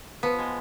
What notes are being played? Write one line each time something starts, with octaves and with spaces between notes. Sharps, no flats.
F3 B3
G#3